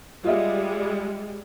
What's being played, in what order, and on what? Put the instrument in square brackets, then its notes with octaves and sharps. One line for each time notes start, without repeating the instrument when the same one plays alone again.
[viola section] G3 G#3 [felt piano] F4 D#5 E5